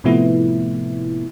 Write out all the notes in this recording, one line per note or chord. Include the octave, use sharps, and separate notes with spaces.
A2 C3 F3 A3 B3 E4